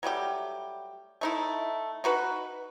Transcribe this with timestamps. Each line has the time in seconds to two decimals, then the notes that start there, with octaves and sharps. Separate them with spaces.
0.03 F#3 G3 A3 G4
1.21 A3 D#4 E4
2.04 D#4 F#4 B4